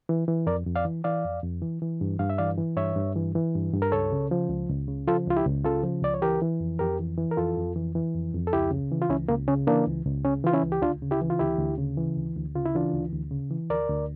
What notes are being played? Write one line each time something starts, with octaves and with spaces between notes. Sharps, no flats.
E3
E3
F2 A#4 D5
F2
D5 F5
E3
E3 D5 F5
F2
F2
E3
E3
G2
G2 F5
E5
E3 D5 F5
E3
G2 C#5 E5
G2
E3
E3
G2
G2
A#4
C#2 A4 C#5
C#3
F3
C#2
C#2
C#3
F3 F4 A4
C#2 F4
E4 G4
C#2
C#3 F4 A4
F3
C#2 D5
C#5
E3 G4 A#4
E3
F2
F2 G4 A#4
E3
E3
A#4
F2 F4 A4
F2
E3
E3
F2
F2
A4
C#2 E4 G4
C#3
E3
F4
C#2 C#4 E4
C#2 A#3
C#3 C#4
E3 A#3 D4
C#2
C#2
C#3 C#4
E3 F4
C#4 E4
C#2
G4
D2 D4 F4
C#3
E4 G4
E3
F4
D2 E4 G4
D2
C#3
E3
D2
D2
C#3 F4
E4
E3 D4 F4
D2
D2
C#3
E3
D2 A#4 D5
D2